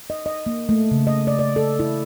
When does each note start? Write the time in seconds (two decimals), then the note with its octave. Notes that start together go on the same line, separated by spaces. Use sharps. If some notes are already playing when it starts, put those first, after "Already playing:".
0.10 D#5
0.26 D#5
0.46 A#3
0.69 A3
0.91 C#3
1.07 D#5
1.27 D5
1.39 D5
1.56 A4
1.79 E4